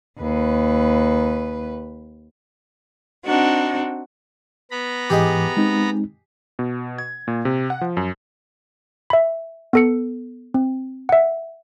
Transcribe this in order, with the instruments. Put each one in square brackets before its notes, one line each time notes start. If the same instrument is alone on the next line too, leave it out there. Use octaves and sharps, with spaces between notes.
[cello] D#2 B4
[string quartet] C4 D4 D#4 F#4
[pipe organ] B3 A#5 B5
[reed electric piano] G#2 E3 D6 [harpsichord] G4 G#4 D#5
[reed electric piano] G#3 C4 D#4
[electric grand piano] B2
G#6
A#2
C3
F#5
F3
F#2
[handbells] E5 B5
B3 A4 C#7
C4
E5 F#5